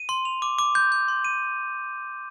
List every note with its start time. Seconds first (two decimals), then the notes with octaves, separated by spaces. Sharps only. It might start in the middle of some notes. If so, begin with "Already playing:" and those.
Already playing: D#7
0.09 C6
0.25 F7
0.42 D6
0.59 D6
0.75 G6
0.92 G6
1.08 C6
1.24 D#7